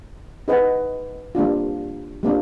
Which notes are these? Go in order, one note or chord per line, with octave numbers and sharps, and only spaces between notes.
D#4 G#4 B4 D#5 F#5
G3 A#3 D4 F4
G3 A#3 D4 F4